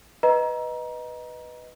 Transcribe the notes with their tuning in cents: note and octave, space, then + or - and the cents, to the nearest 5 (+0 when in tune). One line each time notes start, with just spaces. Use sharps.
B4 +0 D#5 +0 A#5 +25